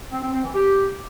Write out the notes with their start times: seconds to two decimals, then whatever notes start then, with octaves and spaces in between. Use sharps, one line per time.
0.12 C4
0.23 C4
0.33 C4
0.44 E3
0.54 G4